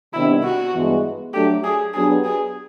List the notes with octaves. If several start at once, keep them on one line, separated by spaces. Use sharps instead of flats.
C3 D#3 G3 B3 D4 E4
F#4
G2 E3 G#3 B3
F#3 A3 D4 F#4 G4 A4
G#4
F#3 B3 D4 G4 G#4
G#4